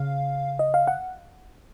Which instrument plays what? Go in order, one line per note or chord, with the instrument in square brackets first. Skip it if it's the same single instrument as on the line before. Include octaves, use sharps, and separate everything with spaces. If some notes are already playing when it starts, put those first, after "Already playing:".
Already playing: [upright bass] C#3 [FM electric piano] F5
[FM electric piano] D#5
F5
F#5